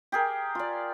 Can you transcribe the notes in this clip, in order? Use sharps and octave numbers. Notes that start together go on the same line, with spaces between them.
G4 G#4 A#4
F4 D5